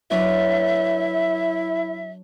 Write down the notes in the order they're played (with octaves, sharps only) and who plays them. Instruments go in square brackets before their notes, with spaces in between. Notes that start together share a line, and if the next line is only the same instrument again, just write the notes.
[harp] F#3 D4 B4 [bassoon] E4 [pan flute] E5